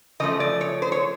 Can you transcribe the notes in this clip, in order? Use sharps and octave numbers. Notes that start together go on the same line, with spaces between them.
C#3 F3 A3 D#5
D5
C#5
C5
C#5